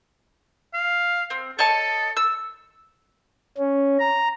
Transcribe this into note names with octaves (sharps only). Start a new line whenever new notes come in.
F5
C4
A4 C#5 D#5 A5
E6
C#4
A#5